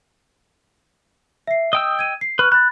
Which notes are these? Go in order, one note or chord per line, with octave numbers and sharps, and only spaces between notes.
E5 C7
D#5 G5 D#6 E6
G#6 D#7
C7
B4 C#6 F6 F#6
B5 F#6 A6